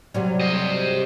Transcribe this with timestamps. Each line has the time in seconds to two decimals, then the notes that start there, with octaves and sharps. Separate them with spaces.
0.14 C3 F#3 G3
0.41 C5 D#5